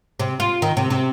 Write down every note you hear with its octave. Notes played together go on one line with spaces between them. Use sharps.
C3
F4
D#3
C3
C3